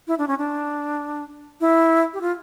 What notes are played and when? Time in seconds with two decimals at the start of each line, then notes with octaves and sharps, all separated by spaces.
0.08 E4
0.18 D4
0.28 C#4
0.39 D4
1.61 E4
2.14 G4
2.21 F4